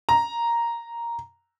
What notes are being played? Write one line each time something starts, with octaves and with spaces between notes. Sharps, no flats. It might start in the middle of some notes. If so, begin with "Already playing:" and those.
A#5